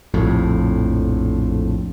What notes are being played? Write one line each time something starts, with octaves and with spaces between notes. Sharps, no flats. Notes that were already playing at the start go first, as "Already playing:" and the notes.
A#1 F2 A2